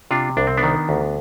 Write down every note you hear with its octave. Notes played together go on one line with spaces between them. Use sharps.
C3 D4 F4
C2 D4
C4
B3 D4
D#3
D2